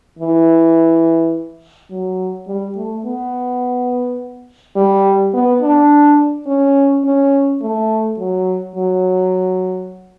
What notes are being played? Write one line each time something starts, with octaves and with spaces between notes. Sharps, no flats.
E3
F#3
G3
A3
B3
G3
B3
D4
C#4
C#4
A3
F#3
F#3